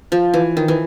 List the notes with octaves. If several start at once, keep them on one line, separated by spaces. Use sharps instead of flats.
F3
E3
D#3
E3